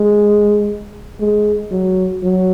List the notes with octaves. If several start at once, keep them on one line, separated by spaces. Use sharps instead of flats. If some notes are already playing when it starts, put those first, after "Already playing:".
Already playing: G#3
G#3
F#3
F#3